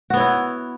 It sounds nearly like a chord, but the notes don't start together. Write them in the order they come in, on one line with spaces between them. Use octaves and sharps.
F#4 B3 C#5 E4